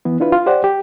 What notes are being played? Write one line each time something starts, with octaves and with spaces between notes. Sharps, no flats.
E3 B3
D4 E4 F4 B4
F4
G4 C5 D5 F#5
G4